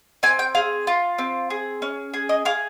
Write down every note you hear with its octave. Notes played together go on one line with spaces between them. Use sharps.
C4 G#5
G5
G#4 F5
F4
C4
G#4
C#4
G#4
D#5
G#4 F5